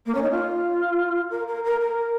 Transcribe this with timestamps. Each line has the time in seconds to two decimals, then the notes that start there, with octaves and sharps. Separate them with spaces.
0.06 A#3
0.15 C#4
0.23 D#4
0.31 F4
1.30 A#4
1.47 A#4
1.64 A#4
1.80 A#4